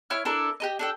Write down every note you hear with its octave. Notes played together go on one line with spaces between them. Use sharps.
E4 C#5 F6
D4 E4 A4 A#4
G4 A4 D#5
D4 A4 G5